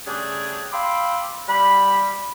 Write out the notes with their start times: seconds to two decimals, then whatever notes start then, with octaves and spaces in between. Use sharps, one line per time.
0.07 C#3 G3 A3 D4 G4 G#4
0.72 F5 G5 B5 C6 D6 E6
1.49 G3 B5